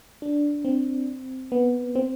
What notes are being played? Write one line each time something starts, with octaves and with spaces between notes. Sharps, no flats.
D4
C4
B3
C4